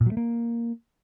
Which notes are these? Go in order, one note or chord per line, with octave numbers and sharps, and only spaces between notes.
A#2
F#3
A3
A#3